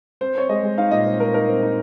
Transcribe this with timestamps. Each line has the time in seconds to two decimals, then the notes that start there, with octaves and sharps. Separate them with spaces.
0.21 C4 C5
0.35 C4 C#5
0.49 G#3 D#5
0.63 G#3
0.78 D#4 F5
0.91 A#2 D#5
1.06 C4
1.20 C4 A#4
1.34 D#4 A#4
1.49 C4
1.63 D#4